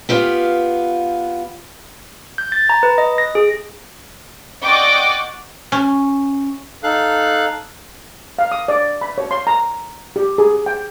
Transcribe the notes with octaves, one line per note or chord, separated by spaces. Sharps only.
B3 F4 G4 F5
G6
A6
A#5
B4
D#5
A#6
G#4
D5 D#5 F#5 G5 C#6 D6
C#4
D#4 A4 F5 F#6
F5
D#6
D5
B5
C#5
C6
A#5
G4
G#4
G5